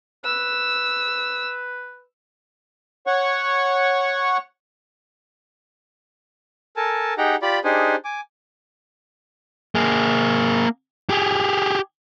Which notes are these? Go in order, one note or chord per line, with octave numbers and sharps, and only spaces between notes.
B4 E6
C#5 F#5 C#6
A4 A#4 G#5 A5
D#4 G4 G#4 F#5 G5 A#5
F4 G4 D5 B5
D4 D#4 G4 G#4 C5 G#5
G#5 D6
A#3 G#4
G4 G#4